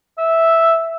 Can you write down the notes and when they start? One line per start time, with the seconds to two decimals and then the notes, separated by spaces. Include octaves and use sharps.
0.18 E5